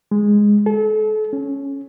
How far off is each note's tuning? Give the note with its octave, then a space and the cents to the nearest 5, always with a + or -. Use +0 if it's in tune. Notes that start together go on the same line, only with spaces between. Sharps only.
G#3 -5
A4 -35
C#4 +0